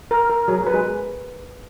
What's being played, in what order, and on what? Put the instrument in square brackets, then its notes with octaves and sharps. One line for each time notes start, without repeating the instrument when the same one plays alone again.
[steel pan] A#4
A#4
[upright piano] F#3 [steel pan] G#4
[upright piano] F#3
[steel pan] B4
[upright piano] G#3